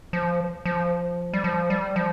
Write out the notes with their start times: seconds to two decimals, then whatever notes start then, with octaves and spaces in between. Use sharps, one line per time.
0.13 F3
0.65 F3
1.33 G3
1.44 F3
1.70 G3
1.96 F3